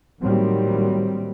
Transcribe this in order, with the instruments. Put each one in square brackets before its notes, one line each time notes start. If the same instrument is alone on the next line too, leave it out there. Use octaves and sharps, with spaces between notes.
[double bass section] A2 D#3 F#3 G3 A#3 C4